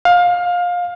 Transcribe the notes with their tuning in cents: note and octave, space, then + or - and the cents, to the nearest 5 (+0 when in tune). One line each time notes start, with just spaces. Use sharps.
F5 +25